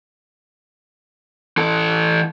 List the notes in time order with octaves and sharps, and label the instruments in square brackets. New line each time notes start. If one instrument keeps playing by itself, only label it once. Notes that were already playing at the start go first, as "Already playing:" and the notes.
[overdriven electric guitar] E3 A4